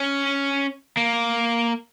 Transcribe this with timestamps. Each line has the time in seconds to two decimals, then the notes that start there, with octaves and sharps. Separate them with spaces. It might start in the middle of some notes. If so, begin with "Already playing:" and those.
Already playing: C#4
0.97 A#3